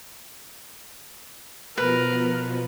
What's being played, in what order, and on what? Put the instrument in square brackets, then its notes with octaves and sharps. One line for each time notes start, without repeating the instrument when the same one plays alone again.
[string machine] B2 F3 B3 [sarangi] A#4 [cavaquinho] B4